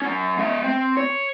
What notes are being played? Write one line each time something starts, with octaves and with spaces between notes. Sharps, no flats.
F#3 C#4
G#3 E5
C4
C#5